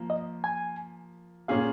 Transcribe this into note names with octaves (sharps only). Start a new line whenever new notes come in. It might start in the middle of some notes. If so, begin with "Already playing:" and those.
Already playing: F3 A#3
D#5
G#5
A#2 A#3 C#4 F4 G#4 F5